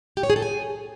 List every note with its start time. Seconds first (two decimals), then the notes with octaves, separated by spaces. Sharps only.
0.17 G4
0.23 C#5
0.30 G#4
0.36 A4
0.42 G#5